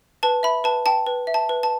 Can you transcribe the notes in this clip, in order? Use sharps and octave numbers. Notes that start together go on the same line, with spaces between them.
B4 A5
E5 B5
B4 A5
G5 A5
B4
E5
A5
B4
A5